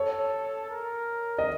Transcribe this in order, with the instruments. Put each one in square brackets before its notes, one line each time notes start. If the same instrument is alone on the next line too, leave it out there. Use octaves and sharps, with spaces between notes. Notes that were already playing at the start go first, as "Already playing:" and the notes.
Already playing: [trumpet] A4 [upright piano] C#5
[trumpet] A#4
[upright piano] D#5